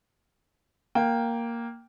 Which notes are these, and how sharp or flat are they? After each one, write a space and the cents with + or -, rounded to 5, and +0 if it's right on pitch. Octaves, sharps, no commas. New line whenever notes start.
A#3 +0 G5 +0